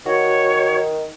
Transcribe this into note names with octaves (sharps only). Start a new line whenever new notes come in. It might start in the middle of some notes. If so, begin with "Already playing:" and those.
D#3 F#4 C#5